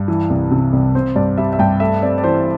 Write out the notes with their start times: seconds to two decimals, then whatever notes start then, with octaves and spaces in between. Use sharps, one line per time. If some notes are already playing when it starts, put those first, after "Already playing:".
Already playing: G2
0.08 E3
0.30 C2
0.51 C3
0.73 C2
0.95 C4 C5
1.16 G2 D5
1.38 G3 E5
1.53 E5
1.59 G2 G5
1.80 A3 E5
2.02 C4 D5
2.18 D5
2.24 E3 C5